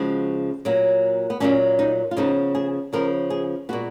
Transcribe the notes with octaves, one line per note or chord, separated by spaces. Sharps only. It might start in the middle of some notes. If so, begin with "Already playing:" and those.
Already playing: C#3 F3 G#3 F#4
A#2 F#3 A#3
B3
A#2 F#3 A#3 C#4
D#4
F4
C#3 F3 B3 D#4
G#4
C#3 F3 B3 A#4
G#4
A#2 G#3 B3 F#4